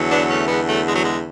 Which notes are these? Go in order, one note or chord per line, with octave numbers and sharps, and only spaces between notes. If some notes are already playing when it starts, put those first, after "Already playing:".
Already playing: E2 D3 F#3
B3 D4
A3 C#4
G#3 B3
F#3 A3
G#3
F#3
G#3